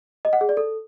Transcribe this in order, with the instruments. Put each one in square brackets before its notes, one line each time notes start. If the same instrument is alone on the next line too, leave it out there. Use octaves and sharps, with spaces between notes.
[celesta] D#5
F#5
G#4
D5
A4